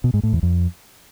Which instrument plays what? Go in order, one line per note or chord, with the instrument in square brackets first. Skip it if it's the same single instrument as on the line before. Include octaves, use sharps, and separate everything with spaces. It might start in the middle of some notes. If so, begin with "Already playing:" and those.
[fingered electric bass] B2
G#2
A2
E2
F2